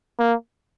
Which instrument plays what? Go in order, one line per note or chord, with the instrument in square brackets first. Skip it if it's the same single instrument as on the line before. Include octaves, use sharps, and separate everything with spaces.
[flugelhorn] A#3